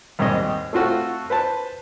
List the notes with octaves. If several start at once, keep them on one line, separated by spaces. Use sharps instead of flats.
D#2 G#2 G3 C4 D#5
A3 C4 F4 F#4 A4
B4 C5 A5